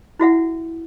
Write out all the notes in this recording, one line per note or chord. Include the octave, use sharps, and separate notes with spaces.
E4 F#4 E5 F#5